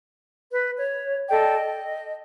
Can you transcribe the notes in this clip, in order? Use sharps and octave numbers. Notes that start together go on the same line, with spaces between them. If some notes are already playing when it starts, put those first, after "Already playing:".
B4
C#5
A4 D5 D#5 G5
D#5